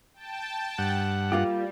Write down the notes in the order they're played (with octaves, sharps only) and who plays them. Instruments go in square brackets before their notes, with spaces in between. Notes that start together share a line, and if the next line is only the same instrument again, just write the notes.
[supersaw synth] G5 A5
[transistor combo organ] G2 F#5
[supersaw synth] G3 [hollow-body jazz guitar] A#3 F4 G4